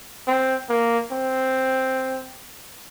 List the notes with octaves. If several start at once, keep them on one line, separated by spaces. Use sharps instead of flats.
C4
A#3
C4